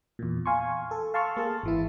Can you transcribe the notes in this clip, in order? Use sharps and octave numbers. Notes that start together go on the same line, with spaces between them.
E2 A#2
F5 G#5 C6 C#6
A4
F5 A5 C6 C#6 E6 F6
A#3 G#4 A5
G#1 E3 E4